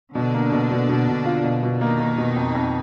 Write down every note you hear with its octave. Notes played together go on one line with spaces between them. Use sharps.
B2 D3 D4
A#3
B2
B2
B2
B2
F4
B2
B2
D#3 A#3 D#4
A#3
B2
F2
F2